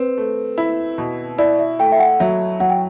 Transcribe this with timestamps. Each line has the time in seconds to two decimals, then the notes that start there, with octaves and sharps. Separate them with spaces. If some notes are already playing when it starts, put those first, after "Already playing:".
Already playing: C4 B4
0.18 A3
0.58 E4
0.98 B2
1.38 E4 D5
1.59 E5
1.79 A3 G5
1.92 E5
1.99 F#5
2.20 F#3 E5
2.60 F#3 F#5
2.70 G5